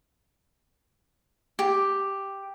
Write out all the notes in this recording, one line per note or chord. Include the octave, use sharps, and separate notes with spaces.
G4